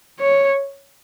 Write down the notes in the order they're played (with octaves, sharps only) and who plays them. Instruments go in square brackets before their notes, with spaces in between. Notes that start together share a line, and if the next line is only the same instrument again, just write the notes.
[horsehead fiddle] C#5